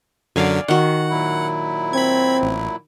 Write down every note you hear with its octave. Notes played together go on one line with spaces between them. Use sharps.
F#2 D3 F#3 D5 F5 G#5
D#3 F#4 F#5
A#2 F#3 E4
C4 B5 G#6
A1